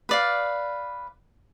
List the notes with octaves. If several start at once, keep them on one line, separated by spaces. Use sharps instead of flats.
B4 D5 F5